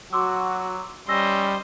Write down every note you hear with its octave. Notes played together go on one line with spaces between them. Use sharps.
F#3 F#4 C6 D6 E6
G3 C#4 C5 D#5 E6 A#6